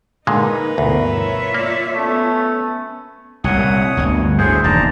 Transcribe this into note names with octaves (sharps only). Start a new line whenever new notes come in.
A#2 D3 G#3 D#4 A#4 B4
D2 G2 B2 E3
F4 C#5 E5
A#3 D5
A3 B3 C#4
C2 A#2 C#5 F#5 D#6
G1 D2
D2 A2 G#4 C5
E1 D#2 D5 A5 A#5